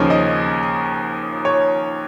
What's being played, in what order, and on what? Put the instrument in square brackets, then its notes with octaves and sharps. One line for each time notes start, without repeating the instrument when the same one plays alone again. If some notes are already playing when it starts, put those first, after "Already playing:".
Already playing: [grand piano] D#2 C#3 F3 C#5
D#5
C#5